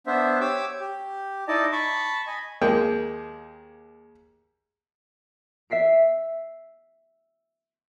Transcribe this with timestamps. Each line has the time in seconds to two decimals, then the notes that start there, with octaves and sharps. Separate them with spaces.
0.07 B3 D4 C5 E5
0.40 G4 C#5 D6 E6
0.79 G4
1.48 D#4 E4 D5 D#5 A5
1.72 A5 B5 C#6
2.27 D#5 G#5 B5
2.61 D#2 G#3 A#3 G5
5.70 E5 B6 C7 D7